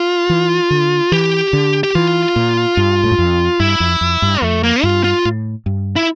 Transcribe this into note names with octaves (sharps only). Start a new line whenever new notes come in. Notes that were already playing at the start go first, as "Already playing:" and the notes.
Already playing: F4
E3
D3
E3 G4
D3
G4
E3 F4
A#2
G2
A2
G2
F2
G2 E4
F2
F2
G2
F2 A3
A#3
G2 F4
F4
A2
G2
E4